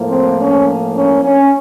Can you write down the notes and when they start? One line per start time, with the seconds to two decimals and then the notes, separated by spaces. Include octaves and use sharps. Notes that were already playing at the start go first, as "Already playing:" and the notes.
Already playing: A2 F3 A#3
0.09 C4
0.38 C#4
0.95 C#4
1.23 C#4